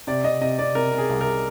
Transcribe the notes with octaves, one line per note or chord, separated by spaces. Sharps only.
C3 D5
C3 D#5
C3 D#5
C3 D5
C3 A#4
C3
G#4
C2
A#4